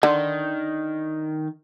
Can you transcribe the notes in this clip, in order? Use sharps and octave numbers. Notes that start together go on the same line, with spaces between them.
D3 D#3